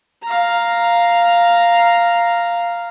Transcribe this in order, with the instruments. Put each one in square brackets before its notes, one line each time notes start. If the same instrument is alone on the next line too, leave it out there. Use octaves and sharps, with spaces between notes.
[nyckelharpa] F5 A#5